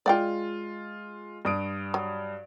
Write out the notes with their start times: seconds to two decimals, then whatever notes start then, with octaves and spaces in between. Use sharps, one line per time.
0.06 G#3 F4 D5 F#5 G5
1.45 G2 D#6 D7
1.94 F#3